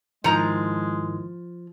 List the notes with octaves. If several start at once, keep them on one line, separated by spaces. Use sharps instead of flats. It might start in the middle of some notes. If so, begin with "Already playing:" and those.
G#2 D#3 F3 G#3 E4 A#5